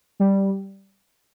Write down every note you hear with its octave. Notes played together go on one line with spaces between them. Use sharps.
G3